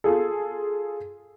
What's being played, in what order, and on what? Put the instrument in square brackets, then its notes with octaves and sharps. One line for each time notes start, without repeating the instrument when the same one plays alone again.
[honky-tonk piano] F4 G#4 A4